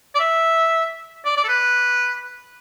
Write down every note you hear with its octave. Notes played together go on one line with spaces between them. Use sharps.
D5
E5
D5
D5
A4
B4